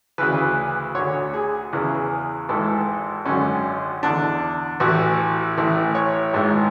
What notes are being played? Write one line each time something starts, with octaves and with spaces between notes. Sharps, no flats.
D2 C#3 E3 B4
D2 D3 C#5
G#4
E2 C#3 E3
G#1 G#2 E3 A4
G#1 F#2 D3 C#4
E2 D3 D4
A1 A2 E3 F#4
A1 A2 E3
C#5
G#1 G#2 E3